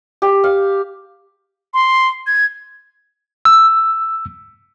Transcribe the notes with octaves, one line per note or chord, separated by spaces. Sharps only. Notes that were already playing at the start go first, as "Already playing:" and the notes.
G4
F5
C6
G#6
E6